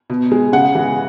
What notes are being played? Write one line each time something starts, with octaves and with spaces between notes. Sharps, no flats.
B2
G#3
C#3 F#5
E3 G#3